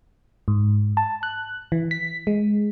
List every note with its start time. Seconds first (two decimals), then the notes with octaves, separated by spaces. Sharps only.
0.48 G#2
0.97 A5
1.23 F#6
1.72 E3
1.91 B6
2.27 G#3